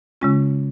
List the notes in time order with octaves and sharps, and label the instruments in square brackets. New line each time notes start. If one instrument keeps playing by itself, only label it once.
[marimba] C#3 G#3 C#4 F4